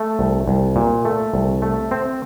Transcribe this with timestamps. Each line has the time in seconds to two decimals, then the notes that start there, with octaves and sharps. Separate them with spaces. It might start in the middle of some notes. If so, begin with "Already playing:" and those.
Already playing: A3
0.19 C2
0.48 C2
0.76 A#2
1.05 A3
1.34 C2
1.62 A3
1.91 C4